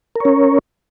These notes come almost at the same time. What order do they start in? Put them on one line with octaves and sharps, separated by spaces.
A#4 C#5 C#4